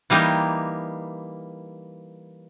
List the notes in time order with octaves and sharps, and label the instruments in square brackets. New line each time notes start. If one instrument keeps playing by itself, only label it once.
[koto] E3 G3 A#3 D#4